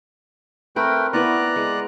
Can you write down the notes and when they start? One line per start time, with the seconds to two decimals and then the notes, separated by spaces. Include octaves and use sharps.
0.76 A3 C4 A#4 B4 G5
1.13 B3 E4 B4 D5 A#5 F#6
1.56 G#3